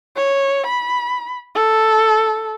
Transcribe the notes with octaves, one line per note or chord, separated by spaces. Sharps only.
C#5
B5
A4